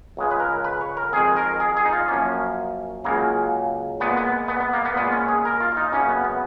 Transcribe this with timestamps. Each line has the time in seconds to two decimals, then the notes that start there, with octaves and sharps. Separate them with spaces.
0.17 C#2 C#3 G#3
0.31 B4
0.40 A#4
0.64 B4
0.81 C#5
0.97 A#4
1.13 F2 D#3 G#3 G#4
1.36 A#4
1.60 G#4
1.77 G#4
1.85 D#4
1.93 F4
2.08 F#2 F3 A#3 C#4
3.04 C#2 C#3 F#3 A#3
4.00 A#2 G#3 B3
4.17 B3
4.48 B3
4.60 B3
4.73 A#3
4.85 B3
4.96 A#2 G#3 B3
5.12 C#4
5.29 G#4
5.45 A#4
5.60 F4
5.72 F4
5.77 D#4
5.92 F#2 C#3 F#3 A#3 C#4
6.09 B3
6.25 B3